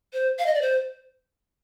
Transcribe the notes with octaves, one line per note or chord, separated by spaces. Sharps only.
C5
F5
D#5
D5
C5